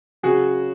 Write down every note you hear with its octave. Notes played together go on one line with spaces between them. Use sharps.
C#3 F#3 F#4 G#4